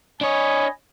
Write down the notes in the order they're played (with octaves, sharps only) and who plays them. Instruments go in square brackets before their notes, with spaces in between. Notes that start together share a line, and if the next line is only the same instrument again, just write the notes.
[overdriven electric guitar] D4 C#5 [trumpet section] D#5 B5 [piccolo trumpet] G#5